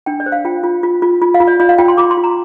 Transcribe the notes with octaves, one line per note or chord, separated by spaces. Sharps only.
D4 G5
D5
C5
F5
F4 G5
F4
F4
F4
F4
F5
F4
D5
F4 D5
F5
F4 G5
C6
F4 D6
C6
F4
A#5